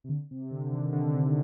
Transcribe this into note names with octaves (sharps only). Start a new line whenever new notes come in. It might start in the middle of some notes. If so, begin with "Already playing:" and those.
C3
D3
C3
D3
D#3
D3
C3